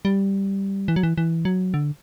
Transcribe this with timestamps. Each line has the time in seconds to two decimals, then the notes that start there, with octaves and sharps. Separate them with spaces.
0.05 G3
0.88 E3
0.96 F#3
1.03 E3
1.18 E3
1.45 F#3
1.74 D3